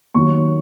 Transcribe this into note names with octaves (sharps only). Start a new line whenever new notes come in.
D#2 D#3 F#3 C#6